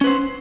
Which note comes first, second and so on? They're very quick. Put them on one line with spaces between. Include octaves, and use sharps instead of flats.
C#4 B4 C5